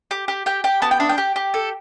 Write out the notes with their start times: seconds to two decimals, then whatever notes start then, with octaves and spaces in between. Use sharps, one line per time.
0.11 G4
0.28 G4
0.46 G4 G5
0.64 G4 G5
0.82 B3 A5
0.91 G5
1.00 D4 E5
1.09 G5
1.18 G4
1.36 G4
1.54 A4